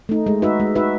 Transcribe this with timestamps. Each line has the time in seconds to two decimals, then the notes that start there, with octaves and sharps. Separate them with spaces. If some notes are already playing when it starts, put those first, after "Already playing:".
0.09 A3 D#4
0.26 G#3
0.42 D#4 F#4 B4 E5
0.60 G#3
0.75 D#4 F#4 B4 E5